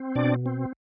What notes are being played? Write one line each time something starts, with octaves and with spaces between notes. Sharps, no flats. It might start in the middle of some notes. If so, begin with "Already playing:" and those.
Already playing: C4
B2 D4 D5
C4